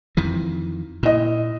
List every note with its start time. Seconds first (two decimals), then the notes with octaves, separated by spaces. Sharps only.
0.17 F2 D#3 E3
1.03 A#2 E4 D#5